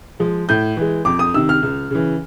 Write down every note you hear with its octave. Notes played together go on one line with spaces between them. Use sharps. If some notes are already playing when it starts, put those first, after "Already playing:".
F3 G#3
A2 G6
E3 G#3
F2 D6
D#6
C3 D#3 E6
F6
C#2
C#3 E3